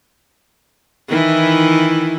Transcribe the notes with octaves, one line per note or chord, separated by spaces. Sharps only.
D#3 E3 E4